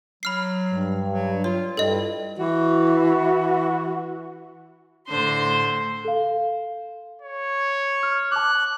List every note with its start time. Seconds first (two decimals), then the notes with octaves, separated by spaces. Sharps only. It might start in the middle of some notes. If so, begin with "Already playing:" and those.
0.23 F#3 B5 F6 C7
0.72 G2
1.11 F#3
1.44 F4 C#5
1.77 G2 E4 A4 D#5
2.38 E3 F#4
5.07 A2 D3 C5 C6
6.05 A4 F5
7.22 C#5
8.03 F6
8.32 A5 D6 F#6